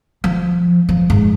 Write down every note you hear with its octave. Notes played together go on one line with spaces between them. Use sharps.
F3
F3
G#2